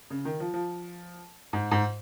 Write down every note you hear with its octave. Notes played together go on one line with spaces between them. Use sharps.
C#3
D#3
F3
F3
G#2
G#2